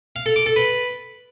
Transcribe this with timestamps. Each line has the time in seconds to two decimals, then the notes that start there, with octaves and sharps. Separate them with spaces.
0.16 F5
0.26 A4
0.36 D6
0.46 A4
0.56 B4